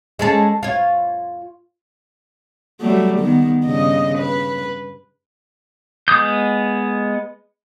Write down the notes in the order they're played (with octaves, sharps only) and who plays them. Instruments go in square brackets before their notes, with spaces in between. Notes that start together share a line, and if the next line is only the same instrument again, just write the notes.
[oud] G#3 C#4 A4
F4 C#5
[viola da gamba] F#3 G3 A3
D#3 B3
G2 C#3 D#5
B4
[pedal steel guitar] G#3 B3 D#6 G6